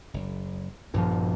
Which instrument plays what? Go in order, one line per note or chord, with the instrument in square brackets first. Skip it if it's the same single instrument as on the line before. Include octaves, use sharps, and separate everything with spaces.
[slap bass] F#1
[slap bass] A#1 A#2 D3 [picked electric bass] G2 F3